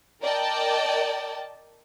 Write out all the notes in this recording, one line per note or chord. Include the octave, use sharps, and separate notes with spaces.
A#4 D5 D#5 G5 A5